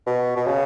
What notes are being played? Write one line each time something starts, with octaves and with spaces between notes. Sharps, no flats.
B2
B2
C#3